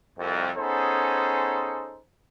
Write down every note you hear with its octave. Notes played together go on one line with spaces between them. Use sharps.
C2 F2
B3 C#4 D#4 G#4 A4 C5